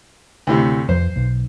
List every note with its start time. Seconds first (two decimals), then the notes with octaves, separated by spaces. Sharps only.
0.47 D2 A2 C3
0.89 F2 C5
1.16 B1